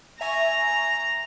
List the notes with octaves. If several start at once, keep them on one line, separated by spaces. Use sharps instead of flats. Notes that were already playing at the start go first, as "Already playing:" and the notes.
E5 G#5 A#5 C#6